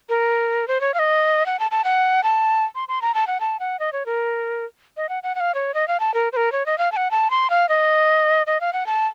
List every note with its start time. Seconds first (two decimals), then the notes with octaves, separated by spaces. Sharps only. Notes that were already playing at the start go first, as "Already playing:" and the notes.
0.09 A#4
0.68 C5
0.81 C#5
0.94 F5
0.99 D#5
1.46 F#5
1.59 A5
1.71 A5
1.84 F#5
2.23 A5
2.75 C6
2.88 C6
3.02 A#5
3.14 A5
3.27 F#5
3.40 A5
3.60 F#5
3.80 D#5
3.93 C#5
4.06 A#4
4.97 D#5
5.09 F#5
5.23 F#5
5.35 F#5
5.40 F5
5.55 C#5
5.74 D#5
5.88 F5
6.00 A5
6.14 A#4
6.33 C5
6.37 A#4
6.52 C#5
6.66 D#5
6.78 F5
6.92 A5
6.97 F#5
7.11 A5
7.30 C6
7.50 F5
7.69 D#5
8.47 D#5
8.61 F5
8.73 F#5
8.86 A5